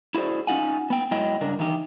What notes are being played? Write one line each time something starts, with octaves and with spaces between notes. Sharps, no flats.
E4 F#4 G#4 C5 D5
C#4 D#4 F4 F#5 G#5
B3 G5
G#2 F#3 G#3 E4 D#5 G5
G2 C#3 D4 A#4
D#3 E3 D#4 G4